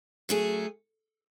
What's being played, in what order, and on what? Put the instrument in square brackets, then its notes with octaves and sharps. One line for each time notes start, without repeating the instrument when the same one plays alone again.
[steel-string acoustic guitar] F#3 A3 C#4 G#4